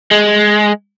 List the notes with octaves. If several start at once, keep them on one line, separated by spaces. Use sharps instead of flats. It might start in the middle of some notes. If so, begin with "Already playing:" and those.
G#3